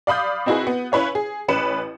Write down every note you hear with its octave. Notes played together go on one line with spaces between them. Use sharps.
D5 F5 B5 D#6 G6
C4 D#4 E4 F#4 G#4 B4
B3
C#4 E4 B4 C#5 F5
G#4
A1 C#4 B4 C#7 E7